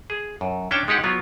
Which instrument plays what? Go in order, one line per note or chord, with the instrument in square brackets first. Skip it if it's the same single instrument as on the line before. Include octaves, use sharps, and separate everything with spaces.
[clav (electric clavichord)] G#4
F#2
C#4 D4 C#5 G5 A5
G#3 D#4 G4 F#5
F#3 B3 F4